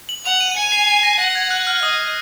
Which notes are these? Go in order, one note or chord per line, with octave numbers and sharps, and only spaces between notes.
F#7
F#5 F7
D#7
D#7
G#5 C#7
C7
C7
A#6
F#5 A#6
G#6
F#6
F6
D#5 D#6